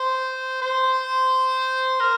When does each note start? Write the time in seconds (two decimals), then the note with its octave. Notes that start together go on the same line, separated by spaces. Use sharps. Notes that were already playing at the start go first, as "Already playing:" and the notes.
Already playing: C5
0.62 C5
2.00 A#4